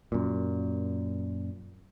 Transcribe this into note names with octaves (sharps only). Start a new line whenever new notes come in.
F#2 A#2